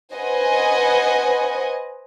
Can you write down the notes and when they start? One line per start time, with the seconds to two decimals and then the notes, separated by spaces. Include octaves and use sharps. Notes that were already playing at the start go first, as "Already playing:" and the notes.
0.14 B4 C5 D#5 F#5 G#5